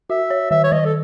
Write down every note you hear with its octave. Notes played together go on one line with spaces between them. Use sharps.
F#4 E5
C#5
D#3 E5
C#5
D#3 D#5
A4